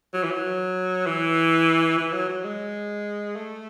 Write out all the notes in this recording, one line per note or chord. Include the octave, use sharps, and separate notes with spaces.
F#3
E3
F#3
E3
E3
F#3
F#3
G#3
A3